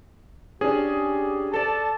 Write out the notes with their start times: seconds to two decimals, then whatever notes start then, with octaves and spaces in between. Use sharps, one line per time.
0.61 C#4 D4 G4 G#4
1.53 A4 D5 A5